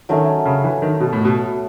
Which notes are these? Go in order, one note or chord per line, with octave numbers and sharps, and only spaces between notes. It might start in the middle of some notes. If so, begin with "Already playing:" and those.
D#3 F#3 A3 C#4
C#3
E3
D#3
B2
A2
B2